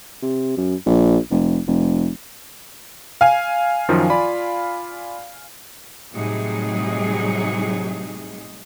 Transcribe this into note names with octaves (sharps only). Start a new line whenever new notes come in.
C3
F#2
A#1
F1
F1
F5 G#5
F#2 D#3 F3
F4 D5 B5
A2 C3 F#3 G3 D#4 G#4